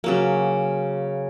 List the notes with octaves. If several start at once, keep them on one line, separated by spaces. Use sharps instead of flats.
C#3 F#3 A#3